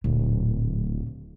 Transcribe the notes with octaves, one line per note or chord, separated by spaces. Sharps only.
D1 A#2 C#3